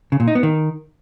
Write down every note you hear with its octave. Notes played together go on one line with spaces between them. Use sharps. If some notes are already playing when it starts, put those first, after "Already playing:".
C#3
A#2
D#4
B3
D#3